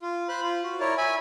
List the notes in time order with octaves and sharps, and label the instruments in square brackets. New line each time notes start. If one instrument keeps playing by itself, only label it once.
[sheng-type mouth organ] F4
C5 B5 F#6
F4
F#4
E4 A#4 C#5 D5
E5 G#5 B5